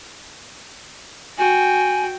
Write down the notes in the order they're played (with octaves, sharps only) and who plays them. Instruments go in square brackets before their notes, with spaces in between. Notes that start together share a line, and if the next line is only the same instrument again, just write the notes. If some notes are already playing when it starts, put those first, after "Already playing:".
[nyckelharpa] F#4 G5 [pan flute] G#5